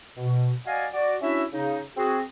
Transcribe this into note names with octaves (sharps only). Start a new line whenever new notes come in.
B2
F#4 D5 D#5 F5 G#5
F#4 D5
C#4 D4 E4 F#4 E5
C#3 D#4
C4 F#4 G#4